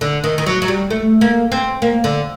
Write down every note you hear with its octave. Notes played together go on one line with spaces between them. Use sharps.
D3
D#3
D#3
F#3
F#3
G3
A3
A#3
C4
A#3
D3